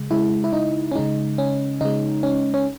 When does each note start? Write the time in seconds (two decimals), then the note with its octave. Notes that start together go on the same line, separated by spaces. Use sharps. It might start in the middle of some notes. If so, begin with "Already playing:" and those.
Already playing: C#3 G#3
0.11 C#3 G#3 E4
0.44 E4
0.53 D#4
0.92 C#4
0.95 C#3 G#3 D#4
1.38 C#4
1.81 C#3 G#3 D#4
2.23 C#4
2.54 C#4